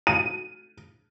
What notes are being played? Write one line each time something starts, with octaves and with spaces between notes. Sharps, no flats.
D#7